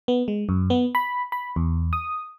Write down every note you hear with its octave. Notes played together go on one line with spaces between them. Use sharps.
B3
G#3
F#2
B3
B5
B5
E2
D#6